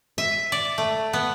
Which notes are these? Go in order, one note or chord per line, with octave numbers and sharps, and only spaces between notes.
E5
D5
A3
B3